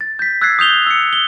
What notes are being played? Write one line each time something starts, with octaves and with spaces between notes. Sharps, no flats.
A6
G6 B6
E6 F#6 G#6 A6 B6 C7
D#6 G6 F7 G7
E6 C#7
G7